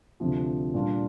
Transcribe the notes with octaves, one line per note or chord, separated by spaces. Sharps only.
D2 C3 F3
A#2 G3 A#3 D4 F4